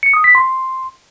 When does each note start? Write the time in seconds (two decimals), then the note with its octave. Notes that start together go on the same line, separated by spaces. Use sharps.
0.03 C#7
0.14 D#6
0.24 B6
0.35 C6